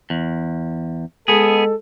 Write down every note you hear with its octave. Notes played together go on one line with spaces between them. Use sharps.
E2
G#3 B3 G#4 A4